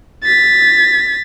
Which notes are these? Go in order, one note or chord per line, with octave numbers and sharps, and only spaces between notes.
A6 B6